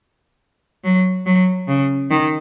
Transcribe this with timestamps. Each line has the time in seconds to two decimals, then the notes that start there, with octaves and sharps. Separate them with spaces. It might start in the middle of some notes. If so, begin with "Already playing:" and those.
0.84 F#3
1.26 F#3
1.68 C#3
2.10 D#3